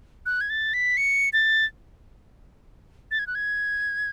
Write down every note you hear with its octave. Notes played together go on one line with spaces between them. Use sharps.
F#6
G#6
A6
B6
C#7
A6
A6
G#6
F#6
G#6